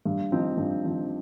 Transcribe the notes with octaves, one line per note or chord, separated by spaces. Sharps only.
G2
F3 C4 D#4
G2
F3 C4 D#4